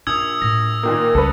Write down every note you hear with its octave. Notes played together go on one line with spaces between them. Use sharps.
A#1 D#4 D#6 E6 G#6
A2 A#6
A#2 D#3 A#3
C#2 G3 D#4 A4 B4